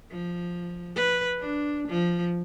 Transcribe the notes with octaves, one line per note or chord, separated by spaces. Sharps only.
F3
B4
D4
F3